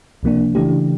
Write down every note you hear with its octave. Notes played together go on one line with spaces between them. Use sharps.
C#2 C3 F3 A#3 D4
C#3 E3 A3 D4 G4